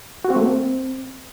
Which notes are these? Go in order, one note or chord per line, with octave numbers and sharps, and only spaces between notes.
F#4
C4
A3
A#3
C4